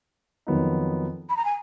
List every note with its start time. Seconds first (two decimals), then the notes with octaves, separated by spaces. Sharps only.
0.47 F2 D#3 F#3 B3 D#4
1.29 B5
1.37 A#5
1.45 G#5